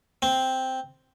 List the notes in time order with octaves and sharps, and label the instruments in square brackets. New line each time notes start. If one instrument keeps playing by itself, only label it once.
[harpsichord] C4